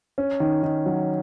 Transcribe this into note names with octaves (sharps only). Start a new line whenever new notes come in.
C#4
D#3
D#3
F#3